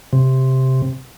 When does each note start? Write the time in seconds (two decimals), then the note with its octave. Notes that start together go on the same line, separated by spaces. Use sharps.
0.13 C3